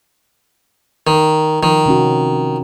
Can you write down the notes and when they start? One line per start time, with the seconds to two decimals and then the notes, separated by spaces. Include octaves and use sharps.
1.07 D#3
1.63 D#3 F3
1.86 C3 C#4 F#4